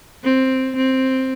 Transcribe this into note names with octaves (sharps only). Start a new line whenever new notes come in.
C4
C4